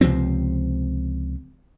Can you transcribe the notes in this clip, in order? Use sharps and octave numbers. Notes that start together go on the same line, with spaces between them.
C#2 C3 F3 C4